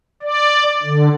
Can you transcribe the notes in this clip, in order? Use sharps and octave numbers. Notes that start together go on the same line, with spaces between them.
D5
D3